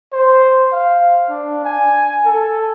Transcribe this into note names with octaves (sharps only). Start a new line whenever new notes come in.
C5
F5
D4
G#5
A4